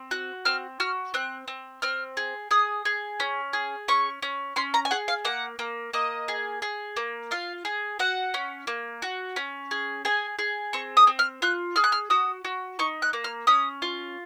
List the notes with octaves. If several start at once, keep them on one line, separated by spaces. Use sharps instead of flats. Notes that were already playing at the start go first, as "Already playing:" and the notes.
Already playing: C4
F#4 F#6
C4 F6
F#4 F6
C4 F#6
C4
C4 F6
G#4
G#4 D#6
G#4
C#4
G#4
C#4 C#6
C#4
C#4 C6
A#5
G#5
G#4 F#5
F5
A#3 F#5
A#3
A#3 D#5
G#4
G#4
A#3
F4 F5
G#4
F#4 F#5
C#4
A#3
F#4
C#4
G#4
G#4 G#5
G#4
C4 C#6
D#6
C4
F6
F4 F#6
G#4 F6
F#6
F6
F#4 D#6
F#4
D#4 C#6
F#6
A#3
F6
C#4 D#6
F4